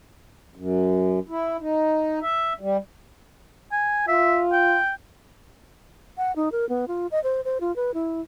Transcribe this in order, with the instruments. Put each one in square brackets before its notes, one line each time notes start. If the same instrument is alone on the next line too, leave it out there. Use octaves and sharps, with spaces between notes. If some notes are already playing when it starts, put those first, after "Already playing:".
[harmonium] F#2
E4
D#4
E5
G3
[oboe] G#5
[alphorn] F4 [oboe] E5
[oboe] G5
[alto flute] F#5
D#4
A#4
B3
F4
D#5
C5
C5
F4
B4
E4